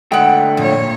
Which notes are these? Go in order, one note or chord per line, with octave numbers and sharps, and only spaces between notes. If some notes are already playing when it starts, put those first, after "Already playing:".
D3 G#3 A3 F#5 G5
F2 A#2 C#5